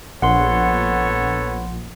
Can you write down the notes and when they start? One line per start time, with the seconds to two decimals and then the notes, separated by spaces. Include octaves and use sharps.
0.22 A#1 B3 A4 C#5 F#5 C6